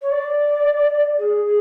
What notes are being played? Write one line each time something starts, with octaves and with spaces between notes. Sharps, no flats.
C#5
D5
G#4
G#4